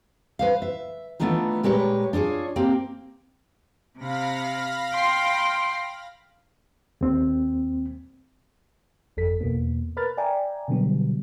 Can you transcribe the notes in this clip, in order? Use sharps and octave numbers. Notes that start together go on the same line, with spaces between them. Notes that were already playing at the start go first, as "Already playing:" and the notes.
B4 C5 F5
E5
E3 A3 B3 D4 D#4 F4
A#2 G#3 G4 A#4 B4 C#5
D4 F4 G#4 C#5
A#3 C4 G4
C3 F5 B5 A#6
G5 C6 C7
D#2 C4
G1 F2 A4 B6
E2 B2 A#3 B3
A#4 B4 B5 F6 F#6 A6
D5 E5 G5 G#5 A#5
B2 D3 F#3 G3 B3